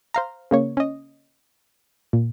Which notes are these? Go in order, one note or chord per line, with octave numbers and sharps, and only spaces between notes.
C5 F5 A#5
C#3 A#3 C#5
C#4 D#5
A#2